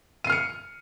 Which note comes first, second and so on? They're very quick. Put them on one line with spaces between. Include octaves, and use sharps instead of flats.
D#7 C7 F6 C#7